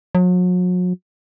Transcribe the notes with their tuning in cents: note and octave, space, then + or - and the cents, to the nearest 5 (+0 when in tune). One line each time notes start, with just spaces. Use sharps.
F#3 -40